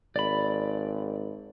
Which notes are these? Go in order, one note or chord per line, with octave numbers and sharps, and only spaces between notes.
G#1 D5 B5